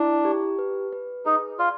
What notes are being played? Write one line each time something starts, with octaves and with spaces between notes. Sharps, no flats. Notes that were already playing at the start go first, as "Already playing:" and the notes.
Already playing: D4 E4
G4
B4
B4
D#4 G#4
F4 D5